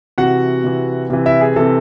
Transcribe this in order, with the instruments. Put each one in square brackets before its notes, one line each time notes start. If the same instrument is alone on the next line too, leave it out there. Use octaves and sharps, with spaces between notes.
[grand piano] C3 E3 F#4 F#5
C3 E3
C3 E3
E4 E5
G#4
C3 E3 A4